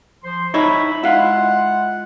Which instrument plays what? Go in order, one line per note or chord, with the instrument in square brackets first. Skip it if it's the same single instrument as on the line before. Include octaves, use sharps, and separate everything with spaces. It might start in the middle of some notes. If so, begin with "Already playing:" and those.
[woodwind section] F3 C5 C6
[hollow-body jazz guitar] D#4 E4 C#5 [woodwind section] B5
[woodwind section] G#3 F4 F#5 [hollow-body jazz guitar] E4 F5